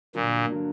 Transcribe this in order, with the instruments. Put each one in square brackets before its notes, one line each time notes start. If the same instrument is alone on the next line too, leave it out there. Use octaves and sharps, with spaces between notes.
[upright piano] G2 D3 F#3 A#3 D4 [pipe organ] A#2
[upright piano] D3 F#3 A#3 D4